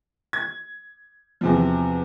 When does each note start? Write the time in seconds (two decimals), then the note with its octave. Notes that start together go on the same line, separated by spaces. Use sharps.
0.33 G#6
1.41 E2 C3 F3